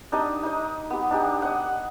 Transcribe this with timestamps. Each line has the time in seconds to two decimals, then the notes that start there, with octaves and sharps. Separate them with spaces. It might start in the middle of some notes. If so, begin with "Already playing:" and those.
0.12 D4 D#4 G4 D#5
0.43 D#4 D#5
0.90 B3 G4
1.11 D4 D#4 G4
1.42 D#5 F#5